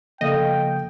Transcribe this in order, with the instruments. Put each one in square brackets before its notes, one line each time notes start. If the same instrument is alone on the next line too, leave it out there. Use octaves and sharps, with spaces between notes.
[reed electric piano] C#3 F3 A#3 [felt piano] A4 F5 [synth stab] D#5 [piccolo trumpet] G5